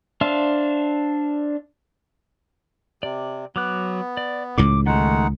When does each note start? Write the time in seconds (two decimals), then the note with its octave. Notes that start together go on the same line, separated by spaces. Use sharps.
0.21 D4 C5 E5 F5
3.03 C3 D5
3.56 F#3 B3 D6 F#6
4.17 D5
4.58 C#2 A2 D6
4.86 D#3 G#3 A3 D#4 F#5